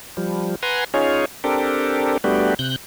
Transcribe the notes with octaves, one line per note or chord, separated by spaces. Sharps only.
F3 G3
B4 F#5 G#5 A#5 C6
C#4 D#4 F4 G#4 C#5
C4 D4 G4 A4 A#4
G3 A3 B3 D4 F#4 G4
C3 F#6 G6